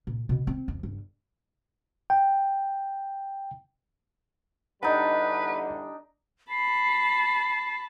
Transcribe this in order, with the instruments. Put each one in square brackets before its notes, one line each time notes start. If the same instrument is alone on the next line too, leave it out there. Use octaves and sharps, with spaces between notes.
[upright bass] A#2
B2
C4
F2
G1
[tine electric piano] G5
[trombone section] E2 D3 G3 [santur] D4 D#4 [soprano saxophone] B4 [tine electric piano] D#5 F#5
[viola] A5 B5 [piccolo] C7